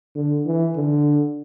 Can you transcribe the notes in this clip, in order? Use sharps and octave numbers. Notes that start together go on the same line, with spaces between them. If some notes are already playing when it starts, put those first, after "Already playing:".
D3
E3
D3